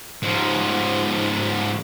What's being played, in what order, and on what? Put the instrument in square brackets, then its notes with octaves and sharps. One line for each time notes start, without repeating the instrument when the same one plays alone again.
[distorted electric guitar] G#2 F3